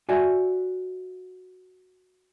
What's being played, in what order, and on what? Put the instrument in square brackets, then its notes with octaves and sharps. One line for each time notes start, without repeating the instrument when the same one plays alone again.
[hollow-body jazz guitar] F#4 D5 E5 G#5